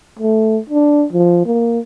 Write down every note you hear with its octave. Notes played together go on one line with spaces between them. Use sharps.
A3
D4
F3
A#3